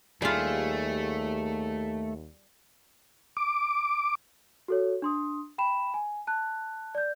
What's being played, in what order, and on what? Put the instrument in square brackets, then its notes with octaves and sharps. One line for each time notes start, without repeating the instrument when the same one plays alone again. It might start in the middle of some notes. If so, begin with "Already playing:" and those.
[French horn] D#2 [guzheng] G3 F4 [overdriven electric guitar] A3 [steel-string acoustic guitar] G#4
[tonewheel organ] D6
[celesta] F#4 A4 C#5
D4 C6 D#6
G5 B5 E7
G#5
A5 F#6
D5 G6